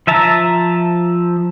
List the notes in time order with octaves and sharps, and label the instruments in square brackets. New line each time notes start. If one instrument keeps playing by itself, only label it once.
[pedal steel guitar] F3 E5 A5 A#5